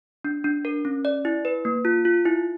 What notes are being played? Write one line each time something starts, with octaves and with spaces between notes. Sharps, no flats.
D4
D4
A#4
C#4
D5
E4
B4
A#3
F4
F4
E4